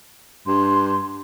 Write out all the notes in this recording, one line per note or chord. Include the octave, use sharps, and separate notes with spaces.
G2 C6